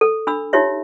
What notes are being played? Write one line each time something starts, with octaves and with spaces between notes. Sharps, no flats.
A4
D4 B5 E6
D#4 F4 G4 C#5 E5